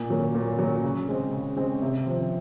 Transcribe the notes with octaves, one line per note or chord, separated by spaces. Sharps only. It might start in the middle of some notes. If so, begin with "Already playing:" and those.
Already playing: A#2
F#3 A#3
A#2
F#3 A#3
C#3
G#3 C4
C#3
G#3 C4
C3
F3 C4